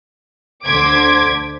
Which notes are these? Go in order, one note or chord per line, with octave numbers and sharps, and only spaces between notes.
D2 D3 C5 D6 G#6 B6